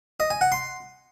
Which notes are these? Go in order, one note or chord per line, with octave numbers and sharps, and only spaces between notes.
D#5
G#5
F#5
C6